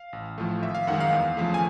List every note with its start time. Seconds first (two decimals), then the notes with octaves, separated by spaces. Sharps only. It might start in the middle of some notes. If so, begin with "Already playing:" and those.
Already playing: F5
0.13 A1
0.38 A2 F3 A3
0.62 G#1 E5
0.75 F5
0.87 F#2 D#3 G#3 F#5
1.00 F5
1.13 E2
1.37 C#3 F3 A3
1.54 G#5